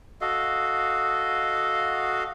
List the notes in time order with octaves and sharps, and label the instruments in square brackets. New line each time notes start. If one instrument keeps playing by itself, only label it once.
[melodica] F#4 A4 D#5 F5